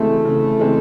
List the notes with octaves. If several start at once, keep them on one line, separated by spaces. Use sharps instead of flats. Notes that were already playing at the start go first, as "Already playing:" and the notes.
Already playing: C#3 E3 G#3 A3 C4
C#3
E3 G#3 C4